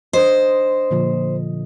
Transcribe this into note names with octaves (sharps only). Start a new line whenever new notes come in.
D4 C5 D#5
A#2 D3 F3